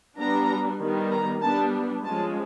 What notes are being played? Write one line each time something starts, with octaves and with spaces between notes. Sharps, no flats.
G3 B3 D4 A#5
D#3 G3 B3
A#5
G3 B3 D4 A5
F3 G#3 C#4 A5